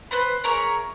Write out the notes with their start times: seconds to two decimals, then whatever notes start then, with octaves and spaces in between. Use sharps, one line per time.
0.11 B4 C5 B5
0.44 G#4 A#4 C#5 E5